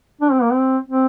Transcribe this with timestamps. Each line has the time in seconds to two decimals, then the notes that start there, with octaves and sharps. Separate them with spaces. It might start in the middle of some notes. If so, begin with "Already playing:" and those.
0.21 D4
0.32 C4
0.42 A#3
0.52 C4
0.88 C4